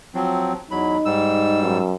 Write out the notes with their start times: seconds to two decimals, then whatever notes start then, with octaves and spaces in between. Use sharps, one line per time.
0.15 F3 F#3 C4
0.71 E2 F#3 D#4 B5
1.05 G#2 G3 E6
1.63 F#2